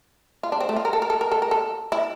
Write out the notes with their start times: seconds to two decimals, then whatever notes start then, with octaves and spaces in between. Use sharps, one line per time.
0.43 F4
0.52 D4
0.60 C4
0.69 A3
0.76 F4
0.85 A#4
0.93 A4
1.02 A#4
1.10 A4
1.21 A#4
1.32 A4
1.42 A#4
1.51 A4
1.92 E4